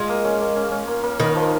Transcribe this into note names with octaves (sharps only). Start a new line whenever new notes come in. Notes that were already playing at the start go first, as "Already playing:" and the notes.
Already playing: G#3 F4
A#3
C#4
A#3
C#4
C#4
A#3
A#3
D#3 A#3
F3